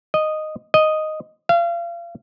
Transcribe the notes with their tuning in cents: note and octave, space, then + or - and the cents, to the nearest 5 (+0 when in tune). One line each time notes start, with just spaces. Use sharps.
D#5 -10
D#5 -5
F5 -35